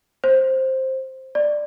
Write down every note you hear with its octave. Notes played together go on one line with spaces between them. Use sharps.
C5
D5